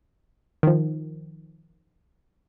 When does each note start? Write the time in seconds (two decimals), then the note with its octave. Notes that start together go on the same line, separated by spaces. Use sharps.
0.63 D#3 F3